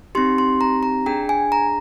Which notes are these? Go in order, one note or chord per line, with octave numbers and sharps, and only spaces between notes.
C4 D#4 G4 C6
C6
A#5
A#5
D4 G#4 G5
G#5
A#5